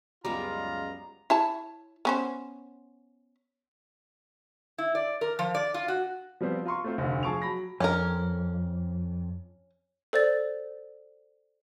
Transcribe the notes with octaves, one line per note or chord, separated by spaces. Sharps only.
C#2 F#2 G3 G#3 B3 F4 A#5
E4 C#5 A5
B3 C#4 C5
E4
D5
A#4
F3
D5
F4
F#4
F3 G3 B3 C4
F4 A#5 C6 C#6
A3 C4 F4
F1 D2
F3 G#4 A5 C#6 D7 F7
F#3 B5 A#6
F2 C#4 A#4
A4 C5 D5 A6